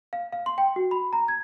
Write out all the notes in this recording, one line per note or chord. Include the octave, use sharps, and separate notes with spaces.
F5
F5
C6
G5
F#4
B5
A#5
G#6